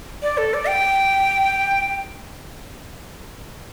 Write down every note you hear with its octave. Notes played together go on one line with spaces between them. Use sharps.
D5
A4
D5
G5